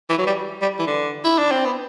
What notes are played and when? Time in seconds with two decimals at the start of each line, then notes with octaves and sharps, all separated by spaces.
0.10 E3
0.18 F#3
0.27 G3
0.62 G3
0.79 E3
0.87 D3
1.24 E4
1.38 D4
1.52 C4
1.65 B3